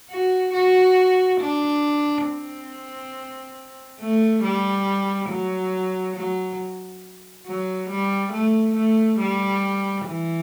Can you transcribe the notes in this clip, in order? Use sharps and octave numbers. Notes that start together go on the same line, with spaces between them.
F#4
F#4
D4
C4
A3
G3
F#3
F#3
F#3
G3
A3
A3
G3
E3